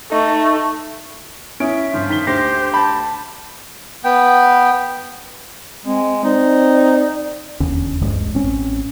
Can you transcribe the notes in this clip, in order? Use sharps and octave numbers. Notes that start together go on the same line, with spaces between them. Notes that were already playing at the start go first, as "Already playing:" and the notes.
A3 D#4
C#4 E4 E5 D#6 D7
G1 F3
D#3 B6 G7
D2 G4 C5 A#6 C7
A5 B5
B3 G5
G#3 C4
C4 D#4 D5
E1 D#2 D3 C#4
D1 A#1 G2 G#3
A1 C4 C#4